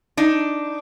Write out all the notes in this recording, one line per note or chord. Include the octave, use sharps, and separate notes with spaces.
D4 D#4